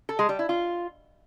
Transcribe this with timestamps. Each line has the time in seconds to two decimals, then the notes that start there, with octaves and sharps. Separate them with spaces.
0.09 A4
0.19 G#3
0.29 G3
0.39 E4
0.49 F4